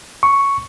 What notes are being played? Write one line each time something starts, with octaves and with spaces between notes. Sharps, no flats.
C#6